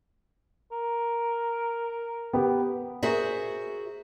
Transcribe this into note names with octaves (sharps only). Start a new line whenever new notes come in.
A#4
B3 G4
F#4 G#4 A#4 C5 E5